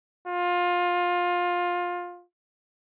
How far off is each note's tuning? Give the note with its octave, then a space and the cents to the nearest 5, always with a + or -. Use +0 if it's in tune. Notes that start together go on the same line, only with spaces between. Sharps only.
F4 +20